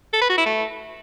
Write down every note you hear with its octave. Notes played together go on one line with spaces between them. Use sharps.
A4
B4
F#4
E4
A3